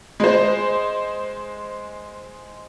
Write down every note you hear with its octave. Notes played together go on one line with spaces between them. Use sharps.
G#3 C5